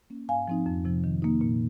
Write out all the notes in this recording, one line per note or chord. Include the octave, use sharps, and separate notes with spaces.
A#3 C#4
G#2 F5 G#5
F3 C4 D#4
F2
C3 F3
D#3
A#3 D#4
A#2